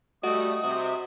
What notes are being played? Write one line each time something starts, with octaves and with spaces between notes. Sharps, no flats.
G3 A3 F#4 D#5 D#6
C3 F#4